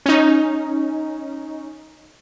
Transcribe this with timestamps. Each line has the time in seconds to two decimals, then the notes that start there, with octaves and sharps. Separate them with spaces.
0.06 C#4 D#4